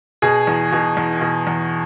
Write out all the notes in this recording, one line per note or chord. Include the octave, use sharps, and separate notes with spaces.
B2 G#4
E2
B2
E2
B2
E2